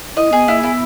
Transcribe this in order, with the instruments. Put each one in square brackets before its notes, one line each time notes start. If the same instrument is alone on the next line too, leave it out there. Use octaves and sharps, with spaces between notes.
[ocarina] E4 [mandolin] D#5
[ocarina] B3 [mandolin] G#4
[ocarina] A#3 [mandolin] E4
[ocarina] B3 [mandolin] E4